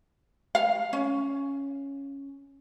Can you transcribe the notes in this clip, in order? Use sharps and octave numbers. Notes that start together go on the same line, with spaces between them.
F5
C#4